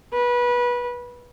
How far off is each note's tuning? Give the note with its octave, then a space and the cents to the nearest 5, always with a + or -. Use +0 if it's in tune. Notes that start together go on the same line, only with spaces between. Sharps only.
B4 -20